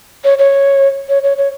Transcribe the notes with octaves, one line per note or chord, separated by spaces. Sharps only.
C#5
C#5
C#5
C#5
C#5